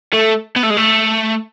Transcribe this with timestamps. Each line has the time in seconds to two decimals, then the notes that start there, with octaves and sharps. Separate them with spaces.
0.13 A3
0.56 B3
0.63 A3
0.70 G#3
0.77 A3